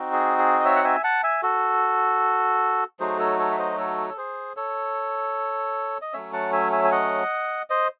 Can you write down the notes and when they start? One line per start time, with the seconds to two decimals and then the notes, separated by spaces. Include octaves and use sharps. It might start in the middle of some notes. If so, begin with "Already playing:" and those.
Already playing: C4 D#4 F#4
0.13 G#4
0.38 G#4
0.60 D#5
0.65 C#5 E5
0.76 F#5
0.84 E5 G#5
1.04 F#5 A5
1.23 E5 G#5
1.43 F#4 A4
3.00 F#3 A3 D#4 F#4 G#4 C5
3.19 A4 C#5
3.39 A4 C#5
3.51 E5
3.58 C5 D#5
3.78 A4 C#5
4.09 A4
4.17 G#4 C5
4.57 A4 C#5
6.02 D#5
6.13 F#3 A3 C#4 C#5 E5
6.33 F#5 A5
6.53 E5 G#5
6.72 E5 G#5
6.84 G#5
6.92 D#5 F#5
7.70 C5 D#5